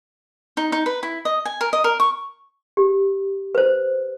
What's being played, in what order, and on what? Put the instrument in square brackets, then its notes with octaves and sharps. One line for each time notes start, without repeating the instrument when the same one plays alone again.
[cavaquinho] D#4
D#4
B4
E4
D#5
G#5
A#4
D#5
A#4
C#6
[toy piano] G4
B4 C5